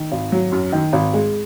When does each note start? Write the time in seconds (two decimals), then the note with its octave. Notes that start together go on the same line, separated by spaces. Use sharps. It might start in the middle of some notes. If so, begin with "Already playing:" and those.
Already playing: D#3
0.12 G#1
0.32 F#3
0.52 F#2
0.72 D#3
0.93 G#1
1.14 G#3